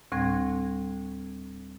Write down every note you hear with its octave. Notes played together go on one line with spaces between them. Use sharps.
D2 A2 G3 C4 G#6